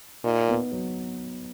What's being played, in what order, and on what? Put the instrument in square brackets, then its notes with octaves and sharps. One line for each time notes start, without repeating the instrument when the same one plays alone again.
[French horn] A#2 [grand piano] D#4
[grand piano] B3
F#3